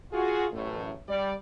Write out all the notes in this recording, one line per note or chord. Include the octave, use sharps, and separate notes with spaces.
F4 F#4 G#4
A1 F#2 A2 A3
G3 D5